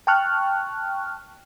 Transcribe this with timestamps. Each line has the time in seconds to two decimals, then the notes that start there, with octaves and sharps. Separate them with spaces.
0.07 G5 A5 C#6 F6 F#6